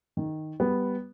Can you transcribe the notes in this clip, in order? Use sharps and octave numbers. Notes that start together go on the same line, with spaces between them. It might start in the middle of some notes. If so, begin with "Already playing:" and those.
D#3
G3 B3